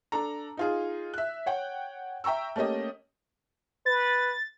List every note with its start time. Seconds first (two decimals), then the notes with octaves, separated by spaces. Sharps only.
0.12 D4 A4 A#5
0.57 D#4 F4 G#4
1.14 E5 F#6
1.46 C#5 F#5 G5
2.24 E5 G5 A#5 C#6 E6
2.56 A3 A#3 C#4 G4 D#5
3.86 B4 A6